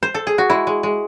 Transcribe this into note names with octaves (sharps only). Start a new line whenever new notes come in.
C5
A4
G#4
F#4
G#3 E4
G#3
G#3